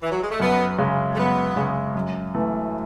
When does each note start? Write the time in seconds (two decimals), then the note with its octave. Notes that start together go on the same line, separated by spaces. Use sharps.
0.01 E3
0.10 F#3
0.21 G#3
0.30 A3
0.40 F#2 B3
0.78 C#3 G#3
1.13 A3
1.17 F#2 B3
1.56 C#3 G#3
1.95 F#2
2.34 E3 A3